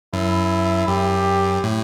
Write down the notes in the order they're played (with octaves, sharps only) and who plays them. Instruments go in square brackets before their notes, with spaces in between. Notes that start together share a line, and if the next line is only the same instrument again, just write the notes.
[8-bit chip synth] F#2 [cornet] E4
[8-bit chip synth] F#2 [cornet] G4
[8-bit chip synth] A2